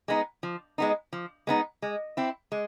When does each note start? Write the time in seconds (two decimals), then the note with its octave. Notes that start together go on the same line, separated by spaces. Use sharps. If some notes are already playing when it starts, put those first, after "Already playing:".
0.08 G#3 B3 D#4
0.43 F3
0.78 G#3 B3 D#4
1.13 F3
1.47 G#3 B3 D#4
1.82 G#3
2.17 C4 E4
2.52 G#3